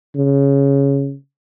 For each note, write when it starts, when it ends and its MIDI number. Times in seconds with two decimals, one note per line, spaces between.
0.15 1.14 49